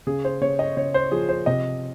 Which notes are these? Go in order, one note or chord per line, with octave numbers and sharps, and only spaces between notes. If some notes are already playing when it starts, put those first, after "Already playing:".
C#3 G#4
C5
C#3 C#5
D#5
C#3 C#5
C5
F3 G#4
C5
C3 D#5